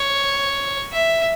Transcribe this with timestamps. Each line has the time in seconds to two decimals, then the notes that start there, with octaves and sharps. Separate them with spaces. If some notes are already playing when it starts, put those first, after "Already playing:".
Already playing: C#5
0.92 E5